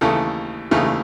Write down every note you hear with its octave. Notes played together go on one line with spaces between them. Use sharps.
D#2 C#3 E3 A3 A4
D#2 C#3 E3 A3